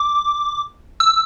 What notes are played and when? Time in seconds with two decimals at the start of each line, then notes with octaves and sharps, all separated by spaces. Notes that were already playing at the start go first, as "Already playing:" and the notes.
Already playing: D6
1.00 E6